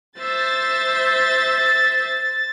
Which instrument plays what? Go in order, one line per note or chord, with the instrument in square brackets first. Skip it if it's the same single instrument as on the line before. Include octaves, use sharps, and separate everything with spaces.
[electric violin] C5 E5 [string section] A6